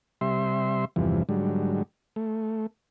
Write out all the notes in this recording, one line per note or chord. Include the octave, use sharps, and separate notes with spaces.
C3 G3 E5 C6
E2 G2 C3 E3 F3
G#2 D3 F#3 G3
A3